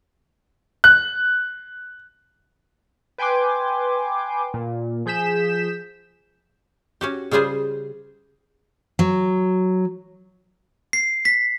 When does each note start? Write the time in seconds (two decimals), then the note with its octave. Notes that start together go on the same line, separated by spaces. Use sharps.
0.84 F#6
3.18 B4 G5 G#5 C6 D6
4.54 A#2
5.06 F3 G#4 G6 B6 E7
7.01 C#4 F#4 G4
7.31 C#3 G3 F4 G#4 C5
8.99 F#3
10.93 C7
11.25 B6